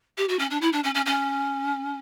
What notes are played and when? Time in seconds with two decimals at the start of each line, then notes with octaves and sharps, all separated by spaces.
0.18 G4
0.29 F#4
0.39 C#4
0.50 D4
0.61 E4
0.73 D4
0.84 C#4
0.95 C#4
1.06 C#4